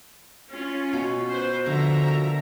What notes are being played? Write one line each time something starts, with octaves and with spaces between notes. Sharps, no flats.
C#4 F4
B2
B4 C5
D3 F3 E5 A#5
A#4